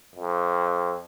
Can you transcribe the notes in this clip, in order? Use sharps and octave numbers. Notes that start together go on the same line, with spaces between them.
F2